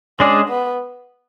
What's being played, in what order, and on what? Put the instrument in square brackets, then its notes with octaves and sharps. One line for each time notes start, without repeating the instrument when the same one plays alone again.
[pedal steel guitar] G#3 D4 G#4 D5 [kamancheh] C#4
[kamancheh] B3